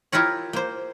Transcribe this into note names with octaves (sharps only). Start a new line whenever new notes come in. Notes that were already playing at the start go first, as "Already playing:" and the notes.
E4 F4 G4 A#4 C#5
A#3 C5